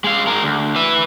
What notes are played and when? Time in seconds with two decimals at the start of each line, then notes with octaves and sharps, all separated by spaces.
0.04 G#3 F5
0.27 G#3 A#4
0.43 D2
0.76 B4 E5